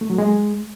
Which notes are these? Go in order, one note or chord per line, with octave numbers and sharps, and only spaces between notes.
A3
F#3
G#3